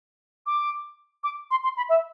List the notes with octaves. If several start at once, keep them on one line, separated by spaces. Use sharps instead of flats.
D6
D6
C6
C6
B5
E5